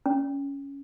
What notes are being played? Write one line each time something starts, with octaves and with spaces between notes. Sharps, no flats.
C#4